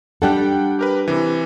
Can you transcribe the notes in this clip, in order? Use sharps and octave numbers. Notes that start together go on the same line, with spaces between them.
G3 D4 A4 F#5 G5 F#6
G4 A#4 B4
C3 E3